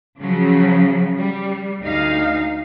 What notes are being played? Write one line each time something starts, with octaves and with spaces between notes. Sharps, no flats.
C#3 F3 F#3
G3
D2 D#4 F5